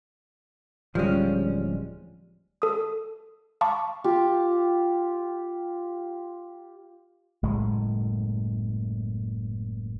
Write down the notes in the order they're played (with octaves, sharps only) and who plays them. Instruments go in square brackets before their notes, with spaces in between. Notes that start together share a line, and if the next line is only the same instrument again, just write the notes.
[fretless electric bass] D1 G3 [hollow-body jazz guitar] F3 G#3 C#4
[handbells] A4 D#6
F5 A5 B5 C#6 D6
[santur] F4 G4
[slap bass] F#1 A2 G#3